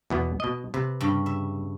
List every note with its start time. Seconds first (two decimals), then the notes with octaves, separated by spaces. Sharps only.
0.10 E2 B2 B3
0.40 B2 D#5
0.74 C3 B4
1.01 G2 C#3
1.26 E5